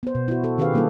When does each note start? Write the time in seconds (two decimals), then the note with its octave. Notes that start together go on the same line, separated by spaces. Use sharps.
0.03 B3 C5
0.15 B2
0.28 E4 F#4
0.44 F#4 A4
0.58 D#3 C#4 G4 G#4 B4 F5
0.73 F#3 G3 A#3 D4 E4 A4